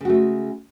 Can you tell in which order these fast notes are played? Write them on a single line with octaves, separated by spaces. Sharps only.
C#3 F#4 A3 G#3